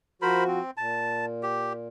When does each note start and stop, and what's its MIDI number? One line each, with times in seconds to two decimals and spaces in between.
0.22 0.60 53
0.22 0.60 66
0.22 0.44 70
0.22 0.44 72
0.22 0.44 83
0.47 0.71 60
0.77 1.88 46
0.77 1.25 81
1.43 1.73 67